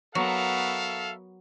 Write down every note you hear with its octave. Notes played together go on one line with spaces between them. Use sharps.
F#3 B3 F#4 A4 A#4 E5 F5